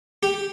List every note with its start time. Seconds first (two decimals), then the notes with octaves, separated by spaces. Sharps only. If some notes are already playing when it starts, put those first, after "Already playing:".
0.23 G4